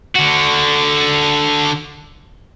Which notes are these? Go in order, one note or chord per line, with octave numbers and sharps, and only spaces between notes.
D3 F#4